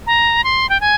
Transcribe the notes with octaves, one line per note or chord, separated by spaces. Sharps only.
A#5
C6
G5
G#5